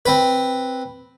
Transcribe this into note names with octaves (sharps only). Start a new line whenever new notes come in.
C4 B4